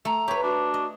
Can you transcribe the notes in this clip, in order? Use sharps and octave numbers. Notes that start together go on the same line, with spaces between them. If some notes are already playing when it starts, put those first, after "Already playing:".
A3 A#5
G4 B4 C#5
D4 F#4
D#5